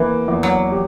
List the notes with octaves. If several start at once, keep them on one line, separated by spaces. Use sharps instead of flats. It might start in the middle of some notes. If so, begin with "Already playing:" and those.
Already playing: E2 E3 A#3
E2
F#3
G4